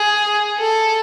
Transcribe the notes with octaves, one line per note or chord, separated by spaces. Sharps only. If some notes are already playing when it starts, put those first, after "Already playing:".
Already playing: G#4
A4